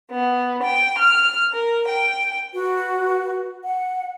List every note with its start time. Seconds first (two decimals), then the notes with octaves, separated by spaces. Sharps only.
0.11 B3
0.64 G5
0.98 F6
1.53 A#4
1.88 G5
2.53 F#4 B4
3.64 F#5